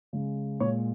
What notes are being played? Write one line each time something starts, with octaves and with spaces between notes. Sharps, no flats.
C#3 G#3
A#2 G#3 C#5